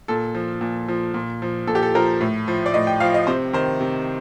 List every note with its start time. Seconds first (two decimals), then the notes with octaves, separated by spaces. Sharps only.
0.08 A#2 A4
0.34 F3
0.61 A#2
0.88 F3
1.14 A#2
1.42 F3
1.67 A#2 A4
1.75 G4
1.83 A4
1.95 F3 A#4
2.21 A2
2.48 F3
2.66 D5
2.74 A2 D#5
2.87 G5
3.00 F3 F5
3.14 D#5
3.27 C3 C5
3.53 D#3 C5
3.80 C3